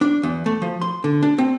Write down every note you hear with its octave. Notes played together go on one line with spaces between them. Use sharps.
D4
E2
A3
F3
C6
D3
D4
C4